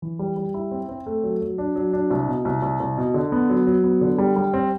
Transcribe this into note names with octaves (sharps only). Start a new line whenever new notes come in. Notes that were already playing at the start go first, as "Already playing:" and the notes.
E3
G3
G3
E4
C4
C4
A3
F#3
F#3
D4
F#3
D4
C2
B2
C2
C2
C2
B2
D3
B3
F#3
F#3
B3
D3
G3
G3
C4